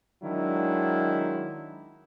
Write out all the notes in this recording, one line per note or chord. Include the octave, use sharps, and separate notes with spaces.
D#3 F#3 G#3 D4 E4